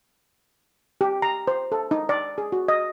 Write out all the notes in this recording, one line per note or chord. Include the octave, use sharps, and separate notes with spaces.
G4
A#5
C5
A4
D#4
D5
G#4
F#4
D#5